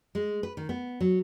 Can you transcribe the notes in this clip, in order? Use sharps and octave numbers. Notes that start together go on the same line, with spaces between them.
G#3
B4
D#3
B3
F#3